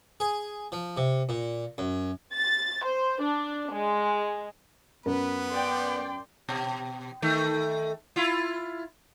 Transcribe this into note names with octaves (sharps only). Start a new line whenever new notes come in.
G#4
F3
C3
A#2
F#2
A6
C5
D4
G#3
F#2 B3 A#4 B4
D5 G5 C6
B2
D#3 A3
E4 F4